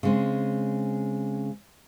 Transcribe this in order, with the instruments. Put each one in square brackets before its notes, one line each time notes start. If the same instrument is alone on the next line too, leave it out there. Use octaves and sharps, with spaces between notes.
[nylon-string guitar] C#3 G#3 C4